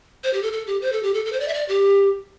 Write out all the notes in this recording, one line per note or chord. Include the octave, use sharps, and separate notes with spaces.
C5
G4
A4
A4
G4
C5
A4
G4
A4
A4
C5
D5
E5
D5
G4